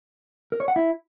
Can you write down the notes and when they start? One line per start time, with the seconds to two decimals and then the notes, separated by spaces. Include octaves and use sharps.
0.52 A#4
0.60 C#5
0.68 F#5
0.76 E4